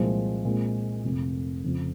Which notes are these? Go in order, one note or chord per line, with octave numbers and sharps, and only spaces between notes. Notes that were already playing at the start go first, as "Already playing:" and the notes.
Already playing: C2 A#2 F3 G#3 C4
A#2 G#3 C4
F1 F2 C3
F1 F2 C#3 F3